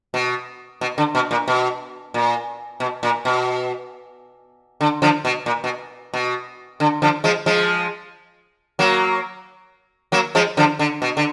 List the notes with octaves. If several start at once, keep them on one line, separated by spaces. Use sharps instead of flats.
B2
B2
D3
B2
A#2
B2
A#2
B2
A#2
B2
D3
D3 F3
B2
A#2
B2
B2
D3
D3 F3
F3 G#3
F3 G#3
F#3 A#3
F#3 A#3
F3 G#3
D3 F3
D3
B2
D3